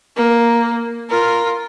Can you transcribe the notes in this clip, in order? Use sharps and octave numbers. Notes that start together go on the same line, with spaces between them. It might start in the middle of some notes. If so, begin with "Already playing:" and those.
A#3
F4 A#4